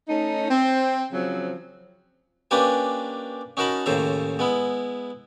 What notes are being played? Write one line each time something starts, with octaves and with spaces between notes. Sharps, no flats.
A3 C#4 D#4
C4
C#3 F3 F#3 C4
A#3 C#4 D4 G4 B4 G#5
C#4 D#4 F#4 A#4 A5 B5
D#2 A2 C#3 C5 E5 A#5
G#3 B3 E4